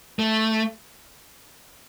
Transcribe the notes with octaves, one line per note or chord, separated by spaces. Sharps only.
A3